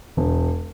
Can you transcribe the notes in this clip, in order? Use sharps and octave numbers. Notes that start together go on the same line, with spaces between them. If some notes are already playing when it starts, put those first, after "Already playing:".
E1